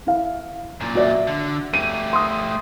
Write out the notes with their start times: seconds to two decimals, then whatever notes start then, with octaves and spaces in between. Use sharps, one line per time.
0.07 E4 F5
0.81 F#2 A#2
0.95 F#4 D5 E5
1.27 D3
1.74 A3 G4 D#7
2.13 C6 D#6